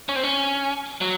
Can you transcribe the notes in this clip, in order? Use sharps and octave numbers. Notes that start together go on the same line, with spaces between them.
C#4
C4
C#4
F#3